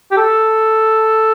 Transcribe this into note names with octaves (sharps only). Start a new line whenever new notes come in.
G4
A4